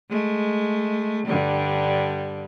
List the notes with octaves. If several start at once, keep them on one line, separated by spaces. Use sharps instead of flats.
G#3 A3
G2 D3 G3